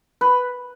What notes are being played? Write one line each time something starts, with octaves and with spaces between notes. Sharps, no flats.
B4